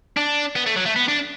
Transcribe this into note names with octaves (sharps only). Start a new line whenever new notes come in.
D4
B3
A3
F#3
A3
B3
D4